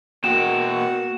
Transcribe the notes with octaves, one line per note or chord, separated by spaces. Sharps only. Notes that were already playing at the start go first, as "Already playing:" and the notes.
B2 A#3 F#4 G5 E7